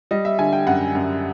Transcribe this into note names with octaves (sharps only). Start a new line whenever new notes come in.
G3 D#5
E5
D3 G#5
G5
F#2 F#5
F#2